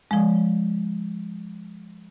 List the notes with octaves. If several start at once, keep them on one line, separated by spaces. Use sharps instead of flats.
F3 G#3